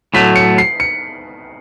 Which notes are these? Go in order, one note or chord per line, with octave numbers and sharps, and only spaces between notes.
A2 F#3 A3 B6
C#7
C7
C#7